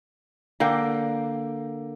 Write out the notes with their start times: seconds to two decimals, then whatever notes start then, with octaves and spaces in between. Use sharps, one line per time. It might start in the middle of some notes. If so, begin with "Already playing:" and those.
0.60 D3 A#3 G5